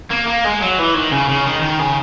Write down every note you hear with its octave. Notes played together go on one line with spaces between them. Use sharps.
A#3
A#3
G#3
F#3
E3
D#3
C#3
C#3
D#3
D#3
C#3